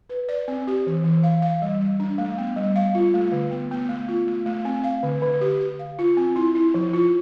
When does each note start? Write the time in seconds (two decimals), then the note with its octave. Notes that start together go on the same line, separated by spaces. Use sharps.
0.10 B4
0.29 D5
0.48 C4
0.67 G4
0.87 E3
1.04 E3
1.23 F5
1.42 F5
1.62 G3
1.81 G3
2.00 D4
2.18 A3
2.38 B3
2.56 G3
2.76 F5
2.95 F4
3.14 A3
3.32 D3
3.51 B3
3.71 B3
3.89 A3
4.08 F4
4.27 A3
4.46 A3
4.65 C4
4.84 F5
5.03 D3
5.22 D3
5.41 G4
5.60 G4
5.79 F5
5.99 F4
6.17 C4
6.36 E4
6.55 E4
6.74 F3
6.93 F4